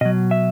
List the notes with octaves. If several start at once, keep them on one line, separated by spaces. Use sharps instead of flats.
B2 F#3 D#5
E5